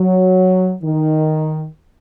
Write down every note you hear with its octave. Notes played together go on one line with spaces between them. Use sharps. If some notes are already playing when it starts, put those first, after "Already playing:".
Already playing: F#3
D#3